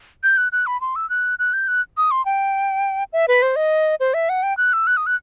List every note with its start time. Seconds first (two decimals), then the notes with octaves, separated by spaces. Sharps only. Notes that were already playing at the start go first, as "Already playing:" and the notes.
0.24 G6
0.37 F#6
0.52 F#6
0.67 B5
0.81 C6
0.96 E6
1.10 F#6
1.39 F#6
1.53 G6
1.68 F#6
1.97 D#6
2.11 C6
2.25 G5
3.13 E5
3.28 B4
3.42 C5
3.56 D#5
4.00 C5
4.14 E5
4.29 F#5
4.43 G5
4.57 F#6
4.73 E6
4.87 F#6
4.97 D#6
5.06 F#6